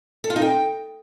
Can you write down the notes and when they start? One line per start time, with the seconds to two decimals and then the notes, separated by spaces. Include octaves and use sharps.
0.24 A4
0.30 F4
0.36 D#4
0.42 G5